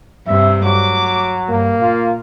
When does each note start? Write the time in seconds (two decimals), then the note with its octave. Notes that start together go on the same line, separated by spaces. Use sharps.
0.27 G2 C3 E5
0.65 F#3 D6
1.49 G2 A#3
1.81 A#2 F4